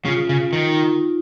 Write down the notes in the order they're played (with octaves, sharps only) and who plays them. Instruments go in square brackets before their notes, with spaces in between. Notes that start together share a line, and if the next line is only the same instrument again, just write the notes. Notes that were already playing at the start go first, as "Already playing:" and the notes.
[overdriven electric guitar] C#3 [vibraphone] F4
[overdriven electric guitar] C#3
D#3
[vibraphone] D#4
F4